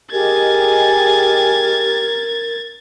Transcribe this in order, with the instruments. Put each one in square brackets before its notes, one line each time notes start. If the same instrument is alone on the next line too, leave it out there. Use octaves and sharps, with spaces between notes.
[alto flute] G4 [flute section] G#4 D#5 G#5 [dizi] A#4 [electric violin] G#6 A6